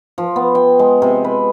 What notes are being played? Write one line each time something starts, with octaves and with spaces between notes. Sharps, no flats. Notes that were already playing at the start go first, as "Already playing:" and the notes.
F3
B3
G5
G#3
C3
B4